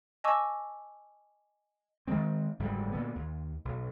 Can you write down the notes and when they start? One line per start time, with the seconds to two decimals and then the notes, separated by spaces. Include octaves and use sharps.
0.24 D#5 G#5 A5 C#6 D6 E6
2.08 D#3 E3 G#3 C4
2.59 F#1 G#2 D3 G3
2.92 A#2 D3 B3
3.15 D#2
3.65 B1